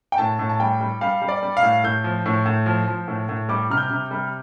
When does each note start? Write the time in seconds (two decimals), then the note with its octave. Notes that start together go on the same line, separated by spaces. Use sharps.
0.12 G5
0.18 A2 A5
0.39 A2
0.49 A5
0.60 G3 G5
0.81 G3
1.01 G3 F5
1.22 G3
1.28 D5
1.42 G3
1.57 F5
1.63 A2
1.84 A2 G6
2.04 F3
2.26 A2
2.46 A2
2.66 F3
2.88 F3
3.08 A2
3.29 A2
3.49 G3 D6
3.70 C3 F6
3.77 G6
3.91 C3
4.11 G3